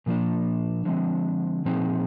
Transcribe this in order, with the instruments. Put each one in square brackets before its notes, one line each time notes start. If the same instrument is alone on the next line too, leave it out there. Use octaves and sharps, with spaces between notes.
[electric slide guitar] A#2 F3 A#3 D4
D3 F3 G#3 C4
A#2 F3 C4 D#4 G#4